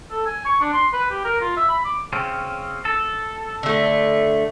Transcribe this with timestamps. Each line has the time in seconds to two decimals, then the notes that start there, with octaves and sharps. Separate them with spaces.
0.11 A4
0.26 G#5
0.45 C#6
0.61 D4
0.73 C6
0.93 B4
1.10 G4
1.25 A#4
1.41 F4
1.57 E5
1.69 B5
1.85 D6
2.13 C#3 C4 C#4
2.85 A4
3.63 D3 A3